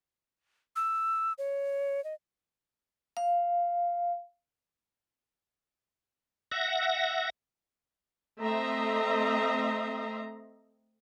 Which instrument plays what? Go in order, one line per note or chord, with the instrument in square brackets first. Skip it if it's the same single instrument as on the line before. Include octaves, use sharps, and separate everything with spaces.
[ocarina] E6
C#5
D#5
[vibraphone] F5
[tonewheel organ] E5 F#5 A#6
[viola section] A3 C4 D#5 E5 A#5 C6